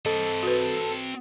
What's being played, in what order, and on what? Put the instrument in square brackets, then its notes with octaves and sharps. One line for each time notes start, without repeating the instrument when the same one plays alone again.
[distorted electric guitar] C4 D#5 [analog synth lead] A4
[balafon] F#4 B4